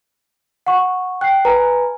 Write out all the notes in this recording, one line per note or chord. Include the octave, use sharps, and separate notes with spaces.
F#5 C#6
G5 F#6 C7
B4 G#5 A#5